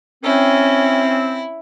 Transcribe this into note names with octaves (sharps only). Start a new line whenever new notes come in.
C4 C#4 E4